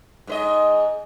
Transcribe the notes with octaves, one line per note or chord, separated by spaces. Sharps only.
G#2 B4 D#5